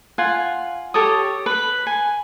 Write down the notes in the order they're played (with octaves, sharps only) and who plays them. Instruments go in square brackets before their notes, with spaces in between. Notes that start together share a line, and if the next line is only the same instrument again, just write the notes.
[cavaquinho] F4 F#5 G#5
G4 A4 C#5 D#6
B4 B5
G#5